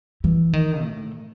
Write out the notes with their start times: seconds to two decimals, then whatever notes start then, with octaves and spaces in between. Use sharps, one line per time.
0.24 E3
0.53 D#3
0.83 A2